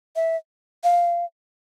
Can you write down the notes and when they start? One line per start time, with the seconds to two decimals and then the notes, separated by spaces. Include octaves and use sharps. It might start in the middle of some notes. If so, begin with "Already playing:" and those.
0.16 E5
0.84 F5